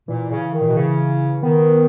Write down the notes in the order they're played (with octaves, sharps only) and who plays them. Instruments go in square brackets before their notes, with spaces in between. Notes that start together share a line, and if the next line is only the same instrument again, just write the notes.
[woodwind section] A#2 [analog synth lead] E3
[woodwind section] C#3
D#3
A#2
B2
C#3
[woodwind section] D#3 [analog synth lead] B3